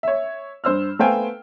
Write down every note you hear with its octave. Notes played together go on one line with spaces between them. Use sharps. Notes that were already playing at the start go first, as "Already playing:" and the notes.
C#5 E5
G2 C5 E6 F6
A3 B3 C5 F5 G5 G#5